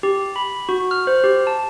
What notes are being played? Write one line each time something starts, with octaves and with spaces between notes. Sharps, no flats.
G4
B5
F#4
F6
C5
G4
A5